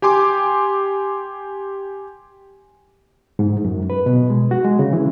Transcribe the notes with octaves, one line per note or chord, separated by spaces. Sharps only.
G4 G#5 C6 D6
G#2
F#2
B4
B2
G#3
F#4
G#3
C#3
E3